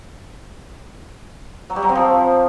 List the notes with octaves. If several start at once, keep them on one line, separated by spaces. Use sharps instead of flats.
F#3
G3
F#3
C4
F3